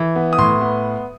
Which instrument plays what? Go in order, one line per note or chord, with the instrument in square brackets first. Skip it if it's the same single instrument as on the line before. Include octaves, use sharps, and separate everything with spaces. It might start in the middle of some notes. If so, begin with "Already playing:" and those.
Already playing: [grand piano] E3
B3
D#6
A2 C6
B3